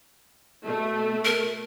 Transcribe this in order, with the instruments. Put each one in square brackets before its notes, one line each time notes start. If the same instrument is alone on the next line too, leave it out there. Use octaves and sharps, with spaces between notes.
[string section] B2 A3
[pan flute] A#4